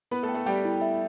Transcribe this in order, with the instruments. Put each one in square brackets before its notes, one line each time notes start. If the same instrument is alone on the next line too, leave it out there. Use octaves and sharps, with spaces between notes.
[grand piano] B3 B4 [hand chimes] E4
[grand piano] A3 A4
[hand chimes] G5
[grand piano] A3 A4
[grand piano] G3 G4 [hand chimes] G5
[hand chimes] E4
E5